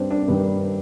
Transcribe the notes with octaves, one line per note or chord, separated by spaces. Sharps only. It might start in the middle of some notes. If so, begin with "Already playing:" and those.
Already playing: G2 G3 C4 D4
D4
G2 D#3 G3